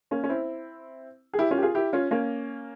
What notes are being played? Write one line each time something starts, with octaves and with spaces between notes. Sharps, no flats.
A#3 C#4
C#4
C4 E4
G#4
E4 G4
C#4 F4
G4
F4 G#4
E4 G4
C#4 F4
A#3 C#4